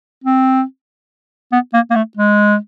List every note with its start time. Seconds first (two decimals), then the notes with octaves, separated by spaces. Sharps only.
0.24 C4
1.52 B3
1.74 A#3
1.91 A#3
1.95 A3
2.17 G#3